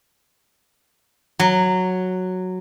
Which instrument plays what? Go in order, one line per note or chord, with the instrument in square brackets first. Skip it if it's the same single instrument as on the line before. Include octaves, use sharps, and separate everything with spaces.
[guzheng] F#3